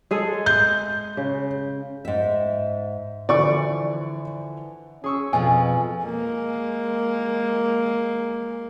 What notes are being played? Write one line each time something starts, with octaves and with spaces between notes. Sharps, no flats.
G#3 G#4 A4
G6
C#3
G#2 E5
D3 E3 F3 D5 C#6
C#4 G#4 C#6 E6
F2 B2 F3 G#5
G#3 A#3